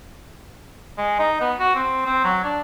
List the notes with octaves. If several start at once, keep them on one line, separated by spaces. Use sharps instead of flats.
G#3
D#4
B3
F#4
C4
C4
F#3
D4